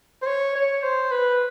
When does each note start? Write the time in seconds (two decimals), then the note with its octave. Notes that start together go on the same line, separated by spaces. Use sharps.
0.22 C5
0.27 C#5
0.55 C#5
0.83 C5
1.12 B4